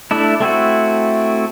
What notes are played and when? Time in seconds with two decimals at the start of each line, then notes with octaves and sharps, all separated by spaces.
0.11 A3 D4 E4
0.40 A3 C4 E4 F#4